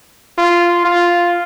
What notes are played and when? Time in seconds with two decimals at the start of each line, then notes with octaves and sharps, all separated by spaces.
0.38 F4
0.85 F4